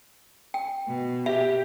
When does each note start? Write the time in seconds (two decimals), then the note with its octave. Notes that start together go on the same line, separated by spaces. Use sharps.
0.54 G5
0.88 B2
1.26 G4 E5 G5